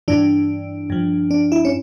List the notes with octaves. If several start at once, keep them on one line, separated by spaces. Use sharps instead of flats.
G2 E3 D4
G2 F3
D4
E4
C#4